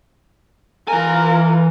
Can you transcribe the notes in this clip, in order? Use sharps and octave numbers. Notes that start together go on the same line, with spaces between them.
E3 F4 A#4 G#5